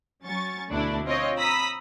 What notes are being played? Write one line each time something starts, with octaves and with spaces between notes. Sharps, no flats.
F#3 C#4 C#6 A6
D2 B2 A3 D4 E4
C4 F4 C#5 D#5
A#5 B5 D#6 E6 B6